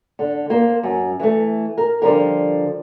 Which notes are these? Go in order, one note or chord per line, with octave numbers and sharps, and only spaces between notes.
D3
A#3 C5
F#2
E3 A3
A#4
D3 F3 G3 A#4